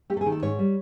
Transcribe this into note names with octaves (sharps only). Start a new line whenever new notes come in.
A3 G4
A4
G#4
D#3
A4
G#2 C#5
G3